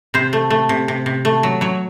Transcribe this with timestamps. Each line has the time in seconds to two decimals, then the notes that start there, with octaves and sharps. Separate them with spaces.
0.14 C3 C5
0.33 A3
0.50 A3
0.69 C3
0.88 C3
1.06 C3
1.25 A3
1.43 F#3
1.61 F#3 C#5